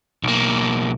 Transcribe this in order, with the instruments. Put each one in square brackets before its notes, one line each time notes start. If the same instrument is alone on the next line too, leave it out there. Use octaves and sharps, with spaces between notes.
[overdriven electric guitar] B1 A#3